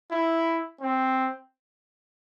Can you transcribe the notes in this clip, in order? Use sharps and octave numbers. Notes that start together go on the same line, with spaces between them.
E4
C4